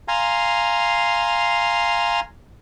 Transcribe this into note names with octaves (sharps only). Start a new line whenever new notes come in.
F5 G#5 A#5 C6